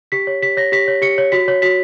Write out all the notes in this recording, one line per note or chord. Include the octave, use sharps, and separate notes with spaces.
G4 B6
C#5
G4 B6
C#5 A#6
G4 B6
C#5
G4 C#7
C#5
F#4 B6
C#5
F#4 B6